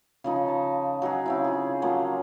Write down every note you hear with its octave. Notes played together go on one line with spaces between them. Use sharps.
C#3 F3 D#4
A5
F#3 D#4 F#4 G#4
C#3 C4 E4
F4 G#4
F3 F#3 A#3